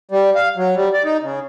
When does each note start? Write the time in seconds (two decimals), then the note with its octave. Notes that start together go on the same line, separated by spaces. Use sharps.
0.11 G3
0.35 F5
0.57 F#3
0.75 G3
0.94 D5
1.05 D#4
1.23 C#3